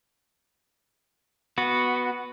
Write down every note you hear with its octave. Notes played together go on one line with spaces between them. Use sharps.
B3 F#4